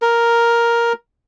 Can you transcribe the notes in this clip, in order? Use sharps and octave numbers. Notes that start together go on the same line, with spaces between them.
A#4